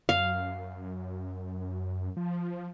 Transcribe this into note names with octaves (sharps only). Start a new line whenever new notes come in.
F#2 F5
F3